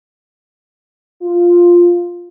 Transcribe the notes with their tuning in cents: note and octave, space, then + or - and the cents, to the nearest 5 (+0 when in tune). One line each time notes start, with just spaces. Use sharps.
F4 +0